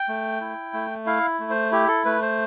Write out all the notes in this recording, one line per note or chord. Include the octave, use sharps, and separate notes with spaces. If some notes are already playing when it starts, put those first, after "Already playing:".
Already playing: G5
A3
E4
A3
E4 F5
A3
C5
E4 G4
A4
A3 B4
C5